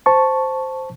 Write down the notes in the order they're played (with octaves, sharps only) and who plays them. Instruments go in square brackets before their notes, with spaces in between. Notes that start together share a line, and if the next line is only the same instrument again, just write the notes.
[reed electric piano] C5 A5 C#6